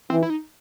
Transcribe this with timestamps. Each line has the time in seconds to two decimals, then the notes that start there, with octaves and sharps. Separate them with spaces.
0.10 E3 C4
0.23 E4
0.30 D#4